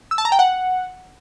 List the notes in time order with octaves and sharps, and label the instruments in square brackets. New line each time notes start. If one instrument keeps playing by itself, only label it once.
[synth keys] E6
A5
A#5
G5
F#5